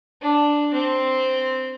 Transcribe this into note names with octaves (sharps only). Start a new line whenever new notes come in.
D4
C4